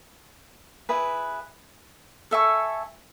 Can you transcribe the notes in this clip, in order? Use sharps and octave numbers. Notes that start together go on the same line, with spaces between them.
E4 G#4 B4
A4 E5 G#5 C#6